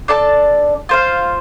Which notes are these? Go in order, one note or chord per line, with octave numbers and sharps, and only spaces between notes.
D4 A4 D5 A5
F4 C5 F5